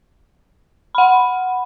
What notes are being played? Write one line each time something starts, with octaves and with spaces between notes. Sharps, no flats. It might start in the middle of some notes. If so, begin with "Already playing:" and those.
F#5 B5